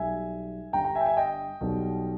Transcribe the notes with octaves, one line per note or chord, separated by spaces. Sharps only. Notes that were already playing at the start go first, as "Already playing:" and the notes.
Already playing: B1 B2 G3 E5 G#5
G1 G2 G3 G5 A#5
G5 A#5
E5 G#5
G5
E5 G#5
D#5 G5
B1 B2 G3